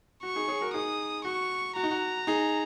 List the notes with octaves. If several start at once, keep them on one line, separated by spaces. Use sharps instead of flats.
F#4 C#6
D#4 G#4
G#4 C#5
F#4 A#4
D#4 G#4 D#6
F#4 C#6
F#4 A#5
D#4
F#4
D#4 G#4